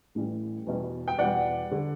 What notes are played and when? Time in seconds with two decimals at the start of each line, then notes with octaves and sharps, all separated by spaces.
0.15 A1 A2 E3 G3
0.67 E2 B2 G3
1.08 G5
1.19 E2 B2 G3 D5 F#5
1.71 D3 G3